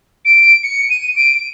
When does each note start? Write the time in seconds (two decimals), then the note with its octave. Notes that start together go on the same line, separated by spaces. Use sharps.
0.25 D7
0.63 C#7
0.90 D#7
1.16 D7